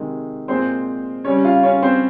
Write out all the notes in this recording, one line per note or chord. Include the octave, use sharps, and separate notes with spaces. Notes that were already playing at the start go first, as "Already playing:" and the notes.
Already playing: C3 D#3 G#3
A#2 G#3 C4 C5
C#3 G3 C#4 C#5
F4 F5
C#4 C#5
C4 C5